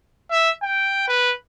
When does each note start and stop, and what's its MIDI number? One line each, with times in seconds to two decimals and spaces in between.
0.31 0.50 76
0.62 1.04 79
1.08 1.33 71